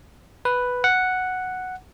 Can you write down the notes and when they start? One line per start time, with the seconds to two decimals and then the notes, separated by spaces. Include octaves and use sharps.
0.45 B4
0.84 F#5